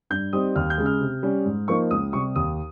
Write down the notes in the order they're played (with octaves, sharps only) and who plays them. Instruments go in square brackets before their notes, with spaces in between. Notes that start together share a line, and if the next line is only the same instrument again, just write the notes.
[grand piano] G2 G6
G3 C4 D#4 D#6
D#2 F6
G6
C#3 G#3
F6
C3
G3 C#4
G#2
F3 A#3 D#4 C#6
C#2 D#6
C3 G3 C#6
D#2 D#6